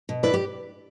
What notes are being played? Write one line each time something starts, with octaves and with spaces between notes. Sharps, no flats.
B2
E4 B4 D5
G4